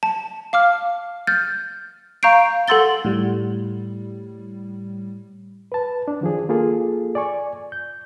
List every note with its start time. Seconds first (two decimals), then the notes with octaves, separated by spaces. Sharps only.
0.03 A5
0.53 F5 D6 F6
1.27 F6 G6 A6
2.23 F5 A#5 C#6 G6 C7 D7
2.68 A4 F#5 C6 E6 A6 G7
3.04 A2 G3
5.72 B4 A5
6.08 D4
6.21 D#3 F3 G#4
6.49 A#3 F4 G#4 A4
7.15 D5 G#5 C#6
7.72 G6